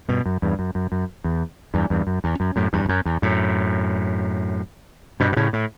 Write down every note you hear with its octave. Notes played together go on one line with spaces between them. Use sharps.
G2 B2
F#2
E2 G2
F#2
F#2
F#2
E2
E2 G2
E2 G2
F#2
E2
F#2
F#2 A2
E2 G2
E2
F#2
E2
F#2 A2
G2 B2
B2
A2 C#3
A2